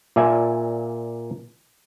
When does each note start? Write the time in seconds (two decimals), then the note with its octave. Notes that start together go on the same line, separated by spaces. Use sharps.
0.16 A#2 D5 E5 G#5